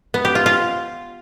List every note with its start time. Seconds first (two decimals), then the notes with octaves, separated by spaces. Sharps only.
0.14 B3
0.25 G4
0.35 F4
0.46 F4